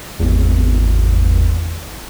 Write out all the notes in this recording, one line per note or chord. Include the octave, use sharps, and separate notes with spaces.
G#1 E2